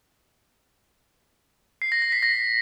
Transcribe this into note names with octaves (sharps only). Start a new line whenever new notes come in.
C7
A#6
A#6
B6
A#6